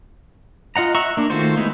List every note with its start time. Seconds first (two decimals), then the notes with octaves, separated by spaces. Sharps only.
0.76 F4 D#5 F#5 A#5
0.95 E5 F#5 A#5 C#6
1.17 A#3 D4
1.30 D#3 A3 F4 F#4 C5
1.57 G#3 A3 B3 D#4 E4